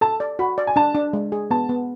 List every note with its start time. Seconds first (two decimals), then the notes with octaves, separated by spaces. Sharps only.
0.01 A4 A5
0.20 D5
0.39 F#4 B5
0.58 D5
0.67 G#5
0.76 D4 A5
0.95 D4
1.13 G#3
1.32 G#4
1.51 B3 A5
1.69 B3